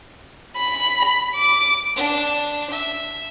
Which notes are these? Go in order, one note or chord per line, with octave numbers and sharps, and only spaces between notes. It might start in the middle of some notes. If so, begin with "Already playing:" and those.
B5
D6
D4
E5